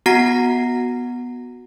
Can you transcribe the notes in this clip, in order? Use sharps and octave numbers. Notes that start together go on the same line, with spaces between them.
B3 F#4 F#5 A#5 A#6 C7